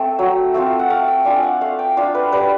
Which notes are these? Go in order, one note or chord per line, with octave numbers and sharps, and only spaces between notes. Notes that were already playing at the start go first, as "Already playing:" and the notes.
Already playing: A3 C4
F#3
A3 C4 F4
F#5
A3 F5
G5
D4 F4 G#5
F#5
A3 F5
G5
D4 F4 F5
B4
G3 B4